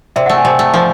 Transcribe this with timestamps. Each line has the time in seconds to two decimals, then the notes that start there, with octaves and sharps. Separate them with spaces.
0.16 C3 D5 E5
0.26 A3 E5 F#5
0.37 F#5 G#5
0.45 C3 G5 A5
0.59 A3
0.74 F3